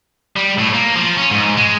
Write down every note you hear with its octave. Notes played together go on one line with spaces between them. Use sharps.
G3
A2
A#3
F3
C#4
G#2
G#3